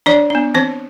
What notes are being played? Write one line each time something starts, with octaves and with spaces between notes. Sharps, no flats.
E3 D4 D5
B3 D4
E3 C4 C5